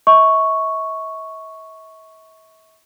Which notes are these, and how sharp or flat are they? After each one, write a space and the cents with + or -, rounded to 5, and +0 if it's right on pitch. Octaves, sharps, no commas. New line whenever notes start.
E5 -40 C#6 +0